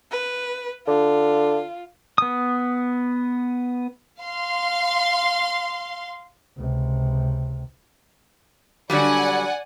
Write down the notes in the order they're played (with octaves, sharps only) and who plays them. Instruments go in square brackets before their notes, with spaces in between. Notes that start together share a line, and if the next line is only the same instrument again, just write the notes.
[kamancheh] B4
[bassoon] D3 [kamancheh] F4
[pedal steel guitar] B3 D#6
[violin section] F5 C6
[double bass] C#2 C3
[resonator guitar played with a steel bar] D3 F#3 G3 [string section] D5 F#5 G#5